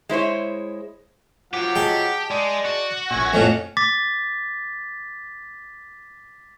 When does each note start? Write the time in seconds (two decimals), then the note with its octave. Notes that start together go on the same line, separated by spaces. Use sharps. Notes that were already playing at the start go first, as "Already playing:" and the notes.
0.09 G#3 E4 C5 C#5
1.54 F3 F#3 G4 F#5
1.75 G#4 D#5 G5 A5
2.31 G#3 D5
2.65 F#4
3.11 A#1 A#2 E5 G#5 C#6
3.34 F2 A2 C#4 F5 G#5
3.77 D6 A6 B6